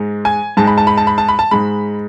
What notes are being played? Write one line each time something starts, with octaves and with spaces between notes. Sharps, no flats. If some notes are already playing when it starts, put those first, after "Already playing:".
Already playing: G#2 G#3
G#5
G#2 G#3 A5
B5
A5
B5
A5
B5
A5
B5
A5
G#2 G#3 B5